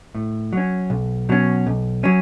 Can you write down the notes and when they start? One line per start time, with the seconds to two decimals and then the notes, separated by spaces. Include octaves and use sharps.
0.15 A2
0.53 F#3 C#4
0.90 B1
1.29 B2 F#3 C#4
1.67 B1
2.04 F#3 C#4